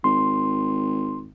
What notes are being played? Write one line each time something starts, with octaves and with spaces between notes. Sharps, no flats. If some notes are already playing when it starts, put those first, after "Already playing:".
G#1 C6